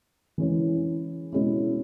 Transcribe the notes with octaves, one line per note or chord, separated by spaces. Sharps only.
E3 G#3 C#4 E4
B2 G#3 C#4 E4